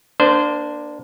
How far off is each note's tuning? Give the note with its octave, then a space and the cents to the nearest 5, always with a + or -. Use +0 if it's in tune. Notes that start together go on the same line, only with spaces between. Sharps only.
A#3 +25 D4 +5 C5 -20